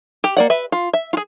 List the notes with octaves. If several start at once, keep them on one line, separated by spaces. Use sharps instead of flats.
G4
A#3 D5 F#5
B4 E5
F4
E5
F4 G#4